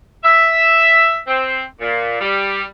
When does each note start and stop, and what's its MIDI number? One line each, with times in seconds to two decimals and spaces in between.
0.24 1.17 76
1.27 1.63 60
1.80 2.18 46
2.21 2.62 55